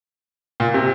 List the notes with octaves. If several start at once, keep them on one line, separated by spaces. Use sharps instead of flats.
A#2
C3